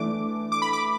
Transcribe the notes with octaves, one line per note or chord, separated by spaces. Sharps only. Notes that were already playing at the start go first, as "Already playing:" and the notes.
Already playing: E3 A3 D4 D6
D6
B5
D6